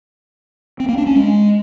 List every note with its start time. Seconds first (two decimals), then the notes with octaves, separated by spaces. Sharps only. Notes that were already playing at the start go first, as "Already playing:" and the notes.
0.80 C4
0.89 A#3
0.98 D4
1.07 C#4
1.16 G#3